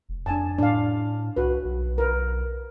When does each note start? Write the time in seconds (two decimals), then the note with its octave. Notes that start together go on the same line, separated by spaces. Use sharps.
0.09 F1
0.26 F2 D4 G#5 A5
0.58 A2 D4 F5
1.37 C2 F#4 B4
1.64 B1
1.98 A#4 B4